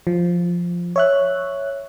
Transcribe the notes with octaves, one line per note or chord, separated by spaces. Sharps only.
F3
C#5 E5 F#6